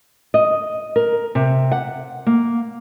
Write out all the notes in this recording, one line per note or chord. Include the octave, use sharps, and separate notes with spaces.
D#5
A#4
C3
F#5
A#3